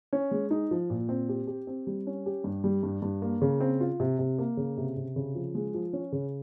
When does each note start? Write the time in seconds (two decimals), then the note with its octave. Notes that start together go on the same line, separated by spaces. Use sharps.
0.13 C#4
0.31 G#3
0.51 D#4
0.71 F3
0.90 A#2
1.09 C4
1.29 G4
1.47 G4
1.67 C4
1.87 G3
2.07 C#4
2.26 G4
2.44 G2
2.64 G3
2.83 G2
3.02 G2
3.22 A#3
3.42 C#3
3.60 C4
3.80 F4
4.00 C3
4.19 C3
4.39 A#3
4.57 C#3
4.77 C3
4.96 C3
5.16 C#3
5.35 F3
5.55 G#3
5.74 F3
5.93 C#4
6.12 C#3